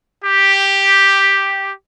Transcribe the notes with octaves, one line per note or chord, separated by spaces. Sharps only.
G4